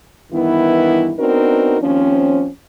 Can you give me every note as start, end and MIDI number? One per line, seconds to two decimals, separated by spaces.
0.32 1.13 43
0.32 1.13 51
0.32 1.13 52
0.32 1.13 59
0.32 1.13 64
1.18 1.77 59
1.18 1.77 60
1.18 1.77 62
1.18 1.77 63
1.18 1.77 66
1.18 1.77 70
1.81 2.46 39
1.81 2.46 53
1.81 2.46 60
1.81 2.46 61